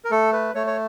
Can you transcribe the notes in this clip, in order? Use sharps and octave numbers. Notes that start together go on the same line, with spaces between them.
A#4
A3 A4
B4
A3 C#5
C#5